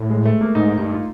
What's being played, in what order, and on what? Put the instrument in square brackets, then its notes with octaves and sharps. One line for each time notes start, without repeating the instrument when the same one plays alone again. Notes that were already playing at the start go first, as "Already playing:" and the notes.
Already playing: [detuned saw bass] A2
[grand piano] G#3
A3
A#3
[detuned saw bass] G#2 [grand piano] D#4
[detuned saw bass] G2 [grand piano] D#4
[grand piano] F4